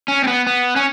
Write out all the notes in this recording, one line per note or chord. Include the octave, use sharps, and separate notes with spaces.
C#4
C4
B3
B3
C#4